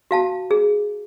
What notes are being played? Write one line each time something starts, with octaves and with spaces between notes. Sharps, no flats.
F#4 F5 A5
G#4